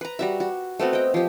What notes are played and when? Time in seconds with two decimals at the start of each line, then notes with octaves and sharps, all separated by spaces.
0.01 B4 A#5
0.19 G3 F#4 E5
0.40 F#4
0.80 A3 B3 C4 F#4
0.93 D#5 G5
1.14 F3 G4